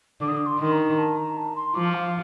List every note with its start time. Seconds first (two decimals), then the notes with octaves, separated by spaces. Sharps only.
0.21 D3 D6
0.28 D#6
0.37 D6
0.46 C6
0.59 D#3 C6
0.72 A#5
0.99 A5
1.18 A#5
1.37 A5
1.56 C6
1.75 F3 D6
1.94 F5